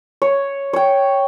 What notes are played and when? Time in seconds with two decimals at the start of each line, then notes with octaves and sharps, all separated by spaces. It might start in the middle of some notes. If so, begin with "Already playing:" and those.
0.22 C#5
0.73 C#5 G5